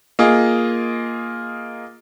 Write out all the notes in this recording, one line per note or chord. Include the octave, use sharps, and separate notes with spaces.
A#3 F4 G#4 D#5